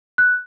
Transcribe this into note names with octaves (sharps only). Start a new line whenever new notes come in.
F#6